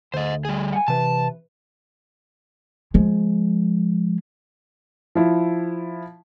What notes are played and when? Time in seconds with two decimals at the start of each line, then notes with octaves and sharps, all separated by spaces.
0.14 D2 C5 D#5
0.45 G3 G#4
0.73 F#5 G#5
0.88 C3 E3 B4 A5
2.94 F3 G#3
5.15 F3 E4